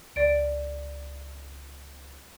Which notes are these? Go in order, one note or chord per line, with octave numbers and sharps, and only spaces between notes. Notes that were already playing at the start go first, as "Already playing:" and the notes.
C#2 D5 D7